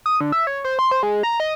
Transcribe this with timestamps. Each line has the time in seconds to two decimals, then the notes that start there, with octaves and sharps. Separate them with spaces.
0.06 D#6
0.21 D3
0.32 E5
0.47 C#5
0.64 C5
0.79 C6
0.91 C5
1.03 G#3
1.23 A#5
1.40 D#5